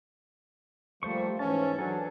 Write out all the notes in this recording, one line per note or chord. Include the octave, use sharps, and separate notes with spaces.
F3 G3 A3 A#3 C5 C#6
G#2 E3 C#4 E5 A5
E3 F#3 D4 A4 G#5